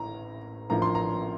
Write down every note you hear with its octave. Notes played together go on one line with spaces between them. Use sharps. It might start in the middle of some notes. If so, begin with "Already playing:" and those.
Already playing: A1 A2 A#5
A1 A2 F3 A#3 D4 A#5
C6
A#5